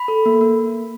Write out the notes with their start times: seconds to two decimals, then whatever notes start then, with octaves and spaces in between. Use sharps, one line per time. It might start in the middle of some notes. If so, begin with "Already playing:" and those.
Already playing: B5
0.08 A4
0.26 A#3
0.41 A#3